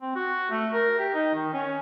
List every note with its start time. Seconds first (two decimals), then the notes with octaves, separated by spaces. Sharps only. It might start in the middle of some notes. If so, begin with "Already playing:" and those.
0.01 C4
0.15 F#4
0.50 A3
0.73 A#4
0.98 G4
1.14 D#4
1.34 D#3
1.53 C#4